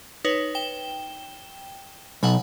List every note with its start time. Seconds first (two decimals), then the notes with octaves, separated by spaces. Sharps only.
0.25 D#4 B4 C#5
0.55 G5 E7 G7
2.23 B1 F#5 G#5 B5